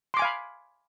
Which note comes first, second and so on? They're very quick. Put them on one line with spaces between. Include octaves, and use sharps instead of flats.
C6 D6 G#5 F5 B5